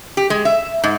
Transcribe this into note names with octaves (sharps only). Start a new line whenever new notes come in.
G4
G#3
E5
G#2